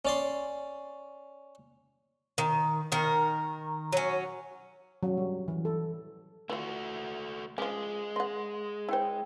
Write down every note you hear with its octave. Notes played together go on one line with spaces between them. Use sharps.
C#4 D5 C6
D#3
D#3 A#4
F#3 C#4
F#3
G3
E3
A4
E3 A3 F4 F#4
C#3 F3 G#3 G#4 F5 G#5
D#5 F#5 C6
E4 C5 C#5 G5